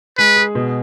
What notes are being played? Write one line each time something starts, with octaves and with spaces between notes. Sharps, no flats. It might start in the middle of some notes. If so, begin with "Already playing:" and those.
G#3 B4
G#4
B2